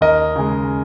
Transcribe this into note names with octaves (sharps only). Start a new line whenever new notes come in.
D#2 A#4 D#5
C#3 G#3